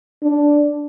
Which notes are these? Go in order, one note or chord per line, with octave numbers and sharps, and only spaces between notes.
D4